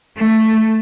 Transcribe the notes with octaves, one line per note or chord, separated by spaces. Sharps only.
A3